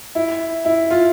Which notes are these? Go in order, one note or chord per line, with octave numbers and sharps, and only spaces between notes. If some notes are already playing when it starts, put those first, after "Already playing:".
E4
E4
F4